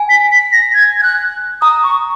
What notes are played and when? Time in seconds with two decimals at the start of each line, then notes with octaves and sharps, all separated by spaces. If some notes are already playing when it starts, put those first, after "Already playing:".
Already playing: G#5
0.09 B6
0.31 B6
0.53 A#6
0.74 G#6
0.99 G#6
1.03 F#6
1.62 A#5 D#6
1.83 C#6